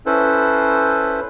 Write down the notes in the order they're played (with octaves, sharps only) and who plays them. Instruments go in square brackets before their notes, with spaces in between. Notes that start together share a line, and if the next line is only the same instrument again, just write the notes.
[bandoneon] C#4 E4 A4 B4 C5